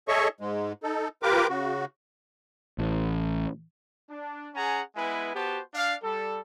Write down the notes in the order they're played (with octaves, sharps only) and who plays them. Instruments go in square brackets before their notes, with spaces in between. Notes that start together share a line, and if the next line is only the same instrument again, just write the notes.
[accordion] G#4 A4 C#5 D#5 E5 C#6
G#2 G#3
D#4 A4
F4 G4 A#4 B4 D6
C#3 F#4
[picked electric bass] A1
[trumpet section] D4
C#4 G#4 F#5 G#5 A#5
G#3 B3 E4 B4 G#5
B3 F#4 G4 C5 A5
D4 D5 F5
G3 A4